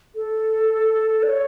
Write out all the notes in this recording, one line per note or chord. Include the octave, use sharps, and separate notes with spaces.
A4
D5
C#5